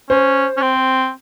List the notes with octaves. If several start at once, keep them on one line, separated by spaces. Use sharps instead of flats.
C#4 C5
C#4
C4